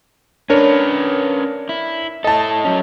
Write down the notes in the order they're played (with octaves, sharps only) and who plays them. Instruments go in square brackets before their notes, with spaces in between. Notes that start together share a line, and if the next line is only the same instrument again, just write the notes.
[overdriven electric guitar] C#4 B4 [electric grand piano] D4 A#4 C#5
[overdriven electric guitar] E4
[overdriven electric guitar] E4 A4 [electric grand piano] D#5 A5
[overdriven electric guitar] F#3 C#4